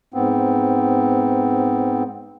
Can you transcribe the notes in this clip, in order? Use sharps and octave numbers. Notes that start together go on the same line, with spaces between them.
G#2 B3 C4